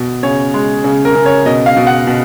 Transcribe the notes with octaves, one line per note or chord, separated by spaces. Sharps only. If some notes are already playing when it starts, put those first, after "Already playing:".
Already playing: B2
C#3 C#5
G#3
C#3
A#4
C#3
C#5
B2 D#5
F5
B2
F#5
B2